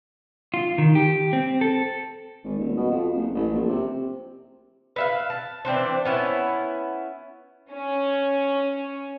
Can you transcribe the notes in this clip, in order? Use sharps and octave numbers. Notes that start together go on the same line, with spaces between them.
F4
D#3
G4
C4
A4
G#1
D#1
B2
F2
F#1
A1
A#1
C3
B4 E5 F5
A5
E3 C4 D4 C5
B3 C#4 E4
C#4